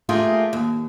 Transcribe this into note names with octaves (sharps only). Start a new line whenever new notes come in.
A3 F4 G4 G#4 A#4
D#2